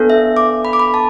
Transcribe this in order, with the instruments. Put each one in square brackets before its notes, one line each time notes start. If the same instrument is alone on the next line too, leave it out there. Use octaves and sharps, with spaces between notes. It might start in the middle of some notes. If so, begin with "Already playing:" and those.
Already playing: [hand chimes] B3 D4 A4
E5
D6
B5
D6
B5
A5